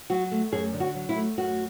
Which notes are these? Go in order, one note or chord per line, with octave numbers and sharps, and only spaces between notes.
F#3 F#4
A3
F#2 G#4
D3
F#4
F#3
E4
A3
F#2 F#4